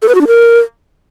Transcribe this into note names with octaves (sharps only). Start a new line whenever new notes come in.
A4
B4
F#4
D4
A#4